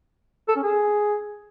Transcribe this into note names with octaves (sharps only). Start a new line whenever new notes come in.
A4
C#4
G#4